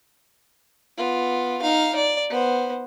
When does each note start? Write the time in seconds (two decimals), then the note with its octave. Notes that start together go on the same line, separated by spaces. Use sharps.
0.97 B3 F4
1.62 D#4 F5
1.96 D5
2.29 B3 C5